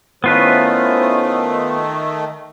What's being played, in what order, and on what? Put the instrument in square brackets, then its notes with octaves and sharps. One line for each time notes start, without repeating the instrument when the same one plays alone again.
[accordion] D#3 A3 [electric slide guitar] B3 F4 B4 [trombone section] C#4 E4 C5